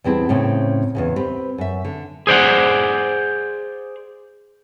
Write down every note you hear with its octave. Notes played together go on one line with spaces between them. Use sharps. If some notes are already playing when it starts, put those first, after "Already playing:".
E2 G3 C4 E4 G#4 A5
A2 C#3 C4 C#4
E2 G#2 C#3
C4 G4 B4
F#2 E5
D3
G#4 C5 D5 F#5